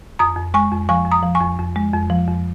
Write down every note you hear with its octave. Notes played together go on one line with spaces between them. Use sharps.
F2 A#5 D#6
F2
G#3 G#5 C#6
F2
F3 G#5 C#6
F2
A#5 D#6
F3
G#5 C#6
F2
F2
G#3
F2
F3
F2